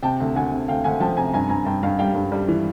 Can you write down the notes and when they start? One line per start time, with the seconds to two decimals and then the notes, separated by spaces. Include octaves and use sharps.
0.03 C3 G5 A5
0.20 D2
0.35 D2 F#5 G#5
0.52 C3
0.68 D2 F5 G5
0.84 D2 F#5 G#5
1.00 F3 G5 A5
1.17 C3 G#5 A#5
1.33 G2 G#5 A#5
1.49 G2 G#5 A#5
1.65 G2 G5 A5
1.83 G2 F5 G5
1.99 G3 F5 G5
2.14 G2
2.32 G3
2.48 E3